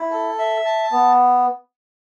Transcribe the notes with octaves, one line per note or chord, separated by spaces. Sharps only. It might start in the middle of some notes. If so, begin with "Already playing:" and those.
Already playing: E4
A4
E5
A5
B3